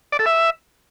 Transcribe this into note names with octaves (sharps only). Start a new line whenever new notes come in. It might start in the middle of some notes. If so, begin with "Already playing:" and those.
D5
A4
E5